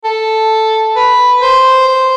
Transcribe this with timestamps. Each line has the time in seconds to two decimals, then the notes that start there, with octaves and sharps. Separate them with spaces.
0.05 A4
0.96 B4
1.42 C5
1.88 C5